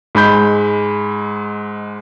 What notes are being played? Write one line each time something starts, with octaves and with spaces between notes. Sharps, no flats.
G#2 G#3 B5 G6